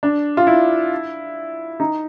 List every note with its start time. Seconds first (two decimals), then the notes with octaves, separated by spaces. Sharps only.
0.03 D4
0.37 F4
0.47 E4
1.80 D#4